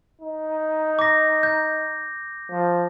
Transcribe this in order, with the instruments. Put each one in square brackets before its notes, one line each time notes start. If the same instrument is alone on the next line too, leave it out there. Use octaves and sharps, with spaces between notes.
[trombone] D#4
[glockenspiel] D6 A#6
G6
[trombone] F3